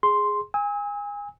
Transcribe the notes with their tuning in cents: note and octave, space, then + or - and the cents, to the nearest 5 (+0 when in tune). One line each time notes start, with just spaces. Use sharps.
G#4 +0 C6 +0
G#5 -25 E6 -45